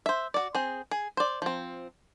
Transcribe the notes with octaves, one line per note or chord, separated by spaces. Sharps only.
C5 E5
F#4 D5
C4 G#4
G#4
C5 D5
F3 C4